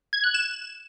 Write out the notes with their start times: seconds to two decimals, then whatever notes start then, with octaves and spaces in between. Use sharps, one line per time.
0.13 G#6
0.24 F#6
0.34 E7